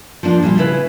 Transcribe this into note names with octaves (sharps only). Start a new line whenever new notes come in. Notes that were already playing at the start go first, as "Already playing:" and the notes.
F3 A#3 D4 F4
A#2 F3 G3 F4
C#3 E4 B4